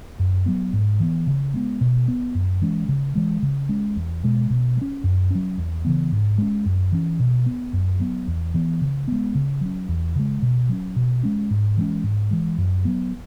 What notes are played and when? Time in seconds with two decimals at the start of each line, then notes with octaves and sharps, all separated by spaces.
0.19 F#2
0.46 F#3 B3
0.73 G#2
1.00 E3 B3
1.27 C#3
1.54 G#3 B3
1.81 B2
2.08 B3
2.35 F#2
2.62 E3 G#3 C#4
2.88 C#3
3.15 E3 G#3
3.42 C#3
3.69 G#3 C#4
3.96 E2
4.24 B2 G#3
4.50 B2
4.77 G#3
4.82 C#4
5.04 F#2
5.31 F#3 C#4
5.58 E2
5.85 C#3 E3 B3
6.12 G#2
6.38 G#3 C#4
6.66 F#2
6.92 E3 C#4
7.20 B2
7.46 B3
7.73 F#2
8.00 F#3 B3
8.27 E2
8.54 E3 B3
8.81 C#3
9.08 G#3 B3
9.35 C#3
9.61 F#3 C#4
9.88 E2
10.15 C#3 G#3
10.42 B2
10.69 F#3 C#4
10.96 B2
11.23 G#3 C#4
11.50 G#2
11.77 E3 G#3 C#4
12.03 G#2
12.31 E3 G#3
12.58 F#2
12.85 F#3 B3